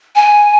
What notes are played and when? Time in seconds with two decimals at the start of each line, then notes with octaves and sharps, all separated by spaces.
0.15 G#5